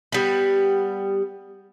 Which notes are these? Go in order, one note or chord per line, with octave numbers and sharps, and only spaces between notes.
G3 B3